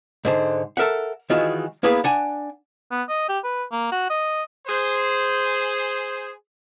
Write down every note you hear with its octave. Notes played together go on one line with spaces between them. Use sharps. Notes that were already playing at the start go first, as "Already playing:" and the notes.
G#2 D3 C5
A4 A#4 E5 F#5
D#3 E3 G#3 F4 F#4
A#3 B3 E4 G#4 B4
D4 F#5 G#5
B3
D#5
G4
B4
A#3
F#4
D#5
G#4 C5